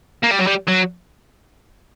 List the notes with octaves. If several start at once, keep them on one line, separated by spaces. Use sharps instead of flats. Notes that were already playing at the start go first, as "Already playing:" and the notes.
A#3
G3
F#3
G3
F#3